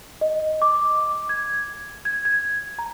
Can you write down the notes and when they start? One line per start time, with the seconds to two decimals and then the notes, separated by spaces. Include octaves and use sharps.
0.21 D#5
0.62 D6
1.29 G#6
2.05 G#6
2.25 G#6
2.79 A#5